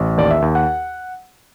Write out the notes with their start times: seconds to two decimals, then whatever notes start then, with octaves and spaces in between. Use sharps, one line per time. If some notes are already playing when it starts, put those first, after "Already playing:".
Already playing: A1
0.18 D#2 D5
0.31 E5
0.42 D#2
0.55 F#5